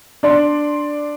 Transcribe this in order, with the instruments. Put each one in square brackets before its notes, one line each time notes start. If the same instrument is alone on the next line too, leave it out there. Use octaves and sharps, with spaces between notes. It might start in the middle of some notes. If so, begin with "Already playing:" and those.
[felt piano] D4 D5 C6